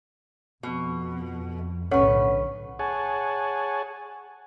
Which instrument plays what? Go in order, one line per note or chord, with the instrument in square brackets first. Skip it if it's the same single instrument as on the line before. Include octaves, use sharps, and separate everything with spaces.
[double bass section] F2 [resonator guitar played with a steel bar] B2
[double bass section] B1 A2 D3 [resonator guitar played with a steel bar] C#4 B4 [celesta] A4 C#5 F#5
[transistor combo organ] G#4 C#5 F#5 G#5 A5